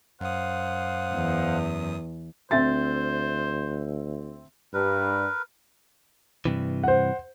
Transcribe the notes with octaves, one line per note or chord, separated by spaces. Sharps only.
F#2 C5 F5 F#5 D#6
E2
D2 C4 C5 E5 A6
G2 A#4 B4
G2 C3 E3
C5 F#5